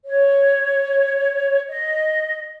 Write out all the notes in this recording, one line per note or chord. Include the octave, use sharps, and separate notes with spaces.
C#5
D#5